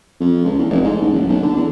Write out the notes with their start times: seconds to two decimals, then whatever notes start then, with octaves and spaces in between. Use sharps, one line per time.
0.20 F2
0.44 C#2
0.59 E2
0.70 F1
0.84 G#2
1.02 A1
1.14 F#1
1.29 B1
1.42 D3
1.57 E2